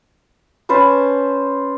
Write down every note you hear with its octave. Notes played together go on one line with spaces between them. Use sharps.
C#4 B4 C5 A5